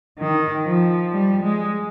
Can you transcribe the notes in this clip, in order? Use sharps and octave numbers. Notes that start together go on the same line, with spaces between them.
D#3
F3
G3
G#3